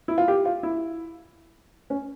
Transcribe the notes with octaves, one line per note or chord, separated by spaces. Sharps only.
E4
F4
G4
F4
E4
C#4